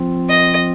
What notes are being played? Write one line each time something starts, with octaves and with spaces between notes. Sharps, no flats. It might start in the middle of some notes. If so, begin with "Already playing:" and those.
Already playing: F3 C4 F4
D#5